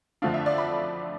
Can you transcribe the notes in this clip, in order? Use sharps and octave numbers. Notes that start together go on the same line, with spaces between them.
F2 D3 F3 A3 D4 F5
E5
D5
B5